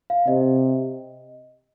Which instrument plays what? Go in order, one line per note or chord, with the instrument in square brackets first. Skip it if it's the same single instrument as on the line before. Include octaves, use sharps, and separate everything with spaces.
[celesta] F5
[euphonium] C3 [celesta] D#5